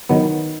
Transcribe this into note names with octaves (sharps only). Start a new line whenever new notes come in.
D#3 F#3 B3